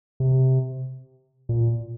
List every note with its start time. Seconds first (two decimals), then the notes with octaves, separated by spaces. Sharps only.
0.20 C3
1.49 A#2